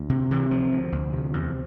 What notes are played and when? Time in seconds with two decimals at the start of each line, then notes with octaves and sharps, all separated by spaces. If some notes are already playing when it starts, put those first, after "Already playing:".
Already playing: D2
0.09 C3
0.31 C3 E3
0.51 D2 F3
0.72 D2
0.92 D2
1.13 C3
1.34 E2